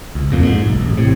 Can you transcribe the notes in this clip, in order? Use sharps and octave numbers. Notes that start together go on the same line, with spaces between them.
C#2
A#1 F2 A#2
G#2
B1
A1
A2 C3